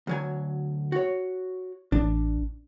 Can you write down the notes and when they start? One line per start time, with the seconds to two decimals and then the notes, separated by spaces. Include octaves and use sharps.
0.07 D2 F#3 G#5
0.92 F#4 C#5
1.92 A1 D4